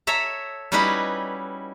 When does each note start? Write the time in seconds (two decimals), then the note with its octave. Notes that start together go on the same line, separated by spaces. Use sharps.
0.07 A4 C#5 E5 A#5
0.72 G3 C#4 D#4 E4 F#4 B4